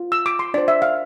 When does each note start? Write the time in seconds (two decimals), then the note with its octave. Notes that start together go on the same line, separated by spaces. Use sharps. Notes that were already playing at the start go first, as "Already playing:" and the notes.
Already playing: F4
0.12 E6
0.26 D6
0.39 C6
0.54 D4 F4 C5 D5
0.68 E5
0.82 F5